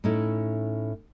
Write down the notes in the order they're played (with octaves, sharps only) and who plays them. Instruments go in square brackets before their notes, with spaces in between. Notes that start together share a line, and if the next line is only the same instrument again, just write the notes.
[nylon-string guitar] A2 C#4 D#4 E4 A4